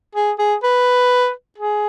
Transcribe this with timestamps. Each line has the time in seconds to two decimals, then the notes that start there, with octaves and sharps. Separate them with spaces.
0.15 G#4
0.38 G#4
0.63 B4
1.58 G#4